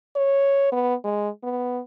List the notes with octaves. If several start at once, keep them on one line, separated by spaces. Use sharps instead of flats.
C#5
B3
G#3
B3